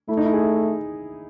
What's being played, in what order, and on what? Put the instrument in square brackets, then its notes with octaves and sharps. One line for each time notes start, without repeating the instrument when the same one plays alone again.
[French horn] A3 [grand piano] E4
[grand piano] D#4
E4
G#4